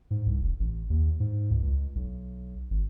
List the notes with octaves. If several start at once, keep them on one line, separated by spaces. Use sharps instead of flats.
G#2
C2
E1
A1
D#2
G#2
C#2
C#2
B1
G#1